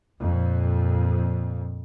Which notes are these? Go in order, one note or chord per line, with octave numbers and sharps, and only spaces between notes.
F2 A#2